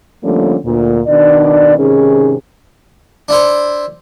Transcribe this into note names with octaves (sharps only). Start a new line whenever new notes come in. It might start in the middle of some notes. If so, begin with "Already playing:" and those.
D3 F3 G3 A3 A#3 C#4
D2 A#2
B2 D#3 D4 D5
G#2 C3 D#3 C#4 G#4
D4 E4 C5